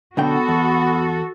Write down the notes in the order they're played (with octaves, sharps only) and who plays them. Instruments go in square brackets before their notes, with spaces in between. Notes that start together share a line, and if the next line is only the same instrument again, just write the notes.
[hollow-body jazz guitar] B1 D3 G5 [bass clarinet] B3 [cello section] F#4 A4
[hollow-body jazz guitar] E2